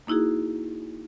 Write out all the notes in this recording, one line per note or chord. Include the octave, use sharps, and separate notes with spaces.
A#3 D#4 E4 F#4 G#4